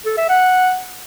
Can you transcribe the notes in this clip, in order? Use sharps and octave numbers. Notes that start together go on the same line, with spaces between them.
A4
E5
F#5